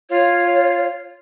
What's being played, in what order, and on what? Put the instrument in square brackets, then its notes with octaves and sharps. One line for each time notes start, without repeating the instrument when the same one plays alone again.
[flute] F4 [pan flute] C#5